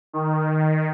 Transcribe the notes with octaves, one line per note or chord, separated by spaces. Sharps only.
D#3